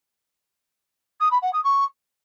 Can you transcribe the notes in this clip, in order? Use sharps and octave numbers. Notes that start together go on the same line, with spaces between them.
D#6
B5
F#5
D#6
C#6